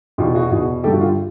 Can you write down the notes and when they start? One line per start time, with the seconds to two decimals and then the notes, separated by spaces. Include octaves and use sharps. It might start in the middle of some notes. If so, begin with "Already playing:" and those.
0.18 E2 B2 F4 G4
0.34 F#4 G#4
0.50 E2 B2 F#4 G#4
0.84 G2 D3 G4 A4
0.93 F#4
1.00 F4 G4